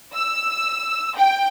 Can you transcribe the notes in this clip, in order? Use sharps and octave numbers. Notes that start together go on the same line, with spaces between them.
E6
G5